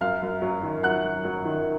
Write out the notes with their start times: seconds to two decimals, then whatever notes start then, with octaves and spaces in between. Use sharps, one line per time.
0.01 F#2 F5 F6
0.22 F#2
0.42 F#3
0.63 D#3
0.83 F#2 F#5 F#6
1.04 F#2
1.25 F#3
1.45 D#3